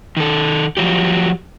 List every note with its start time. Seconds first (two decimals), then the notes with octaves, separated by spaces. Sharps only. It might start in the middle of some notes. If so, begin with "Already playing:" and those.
0.17 D#3 A4
0.77 F3 F#3 G4